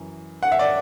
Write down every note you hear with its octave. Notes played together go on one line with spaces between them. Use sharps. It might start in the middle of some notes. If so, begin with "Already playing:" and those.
Already playing: F#2 E3
F#5
E5
D5